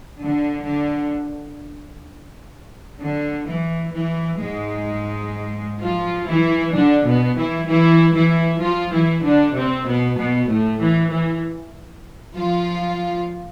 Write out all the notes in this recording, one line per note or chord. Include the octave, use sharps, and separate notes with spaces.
D3
D3
D3
E3
E3
G#2 G#3
F3 F4
E3 E4
D3 D4
B2 B3
E3 E4
E3 E4
E3 E4
F3 F4
E3 E4
D3 D4
C3 C4
B2 B3
B2 B3
A2 A3
E3
E3
F3 F4